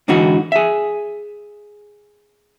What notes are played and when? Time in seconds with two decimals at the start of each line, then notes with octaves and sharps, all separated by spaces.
0.08 G#2 D3 E3 D#4 F#4
0.52 G#4 E5